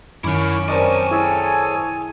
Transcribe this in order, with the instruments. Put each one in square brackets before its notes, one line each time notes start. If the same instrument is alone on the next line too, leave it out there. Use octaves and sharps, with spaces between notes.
[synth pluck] F#2 D#3 [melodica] C#4 C#6 D6 [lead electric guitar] E4 A#4
[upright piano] C4 A#4 D5 [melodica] C#4 C#6 D#6 [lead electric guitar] G#5 A5
[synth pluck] E4 [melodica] G#4 A4 C#5